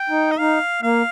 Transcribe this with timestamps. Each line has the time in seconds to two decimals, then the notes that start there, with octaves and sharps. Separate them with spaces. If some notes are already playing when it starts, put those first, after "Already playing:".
Already playing: G5
0.10 D#4
0.31 D#5
0.39 D#4 F5
0.82 A#3 F5